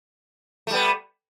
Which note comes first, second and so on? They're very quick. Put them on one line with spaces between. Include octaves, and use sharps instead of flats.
A3 G3 B3